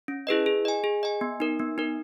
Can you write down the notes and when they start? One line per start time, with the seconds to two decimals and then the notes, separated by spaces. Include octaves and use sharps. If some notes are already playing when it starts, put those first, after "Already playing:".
0.08 C#4
0.27 E4 G#4 B4 D#5
0.46 G#4
0.65 D#5 G#5
0.84 G#4
1.03 D#5 G#5
1.21 B3
1.40 D#4 A#4
1.59 B3
1.78 D#4 A#4